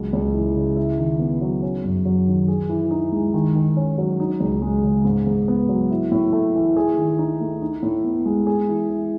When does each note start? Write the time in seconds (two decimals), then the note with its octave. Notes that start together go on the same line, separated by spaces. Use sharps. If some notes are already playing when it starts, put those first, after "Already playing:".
Already playing: C#2 F#3
0.13 C#2
0.34 E3
0.56 C#3
0.76 E4
0.98 D#3
1.19 B3
1.41 F#3
1.62 C#4
1.84 F#2
2.05 F#3
2.27 D#3
2.48 G#4
2.69 E3
2.91 D#4
3.12 G#3
3.34 D#3
3.55 D#3
3.77 C#4
3.98 F#3
4.20 D#4
4.40 C#2
4.62 G#3
4.84 C#3
5.05 G#2
5.27 G#2
5.48 B3
5.69 F#3
5.90 E4
6.12 A2
6.33 A3
6.55 E3
6.77 G#4
6.98 D#3
7.19 D#4
7.41 A3
7.62 D#4
7.83 A2
8.04 B3
8.26 G#3
8.47 G#4
8.68 E3
8.90 E4